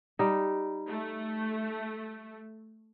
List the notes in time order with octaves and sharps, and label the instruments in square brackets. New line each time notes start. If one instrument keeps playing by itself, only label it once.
[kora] G3 D#4
[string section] A3